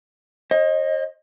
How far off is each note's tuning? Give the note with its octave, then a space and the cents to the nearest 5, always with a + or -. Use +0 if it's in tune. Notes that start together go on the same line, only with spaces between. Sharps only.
C5 +45 D#5 +0